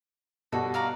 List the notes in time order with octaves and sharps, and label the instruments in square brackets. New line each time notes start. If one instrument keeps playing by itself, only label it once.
[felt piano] B2 G3 F#4 [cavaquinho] A4
[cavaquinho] D5 F5 A#5